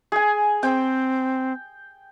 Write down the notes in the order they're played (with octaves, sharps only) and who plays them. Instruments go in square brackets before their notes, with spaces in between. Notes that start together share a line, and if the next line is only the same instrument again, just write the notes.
[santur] G#4 G#5
[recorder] C4 [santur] G5